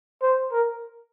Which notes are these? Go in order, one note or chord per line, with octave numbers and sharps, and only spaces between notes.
C5
A#4